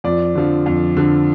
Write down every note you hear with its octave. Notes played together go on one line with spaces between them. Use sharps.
F2 D5
D3 F3
F2
D3 F3